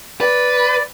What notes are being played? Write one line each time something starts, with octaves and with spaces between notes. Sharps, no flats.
B4 D5